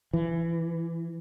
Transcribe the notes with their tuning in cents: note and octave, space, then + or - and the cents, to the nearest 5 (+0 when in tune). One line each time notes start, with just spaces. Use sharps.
E3 +20